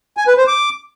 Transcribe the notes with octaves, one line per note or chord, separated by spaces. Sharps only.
G#5
B4
C5
D6